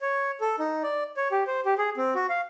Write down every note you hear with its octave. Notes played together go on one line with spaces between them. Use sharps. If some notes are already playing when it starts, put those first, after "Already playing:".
C#5
A4
D#4
D5
C#5
G4
C5
G4
G#4
C4
F#4
F5